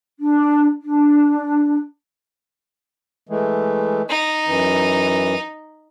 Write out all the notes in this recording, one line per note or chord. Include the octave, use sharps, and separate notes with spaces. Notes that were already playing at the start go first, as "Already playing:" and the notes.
D4
D4
E3 G#3 A3
D#4
F#2 E3